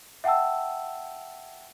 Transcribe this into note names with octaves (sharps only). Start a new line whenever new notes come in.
E5 F#5 G5 A5 E6